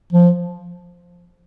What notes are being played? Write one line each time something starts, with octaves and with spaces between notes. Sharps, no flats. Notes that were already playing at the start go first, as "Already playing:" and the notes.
F3